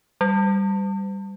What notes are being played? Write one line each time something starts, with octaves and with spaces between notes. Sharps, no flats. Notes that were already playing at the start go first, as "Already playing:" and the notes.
G3